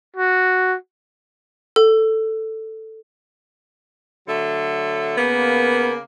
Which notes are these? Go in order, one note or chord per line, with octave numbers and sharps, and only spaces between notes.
F#4
A4
D3 F#3 A3
C#3 A#3 B3